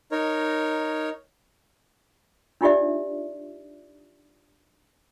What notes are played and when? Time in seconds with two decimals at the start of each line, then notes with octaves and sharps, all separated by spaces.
0.12 D#4 A#4 C#5
2.61 D4 D#4 F4 G4 D5 E5